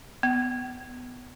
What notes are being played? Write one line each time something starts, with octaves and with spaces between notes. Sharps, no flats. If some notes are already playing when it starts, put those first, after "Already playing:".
B3